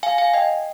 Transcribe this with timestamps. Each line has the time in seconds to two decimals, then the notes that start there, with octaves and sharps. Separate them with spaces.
0.03 F5 G#5
0.18 F5 G#5
0.33 D#5 G5